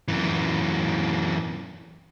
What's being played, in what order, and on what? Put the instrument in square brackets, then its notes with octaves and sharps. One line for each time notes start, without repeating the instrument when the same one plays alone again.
[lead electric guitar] F#2 E3